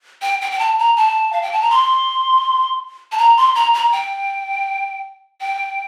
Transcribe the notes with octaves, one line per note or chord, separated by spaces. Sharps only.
G5
G5
G5
A5
A#5
A5
F5
G5
A5
A#5
C6
A5
A#5
C6
A#5
A#5
G5
G5